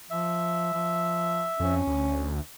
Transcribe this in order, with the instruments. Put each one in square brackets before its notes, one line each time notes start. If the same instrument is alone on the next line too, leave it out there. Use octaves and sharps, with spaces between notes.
[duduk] F3 [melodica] E5
[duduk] F3
[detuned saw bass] F2 [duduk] C#4
[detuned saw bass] D2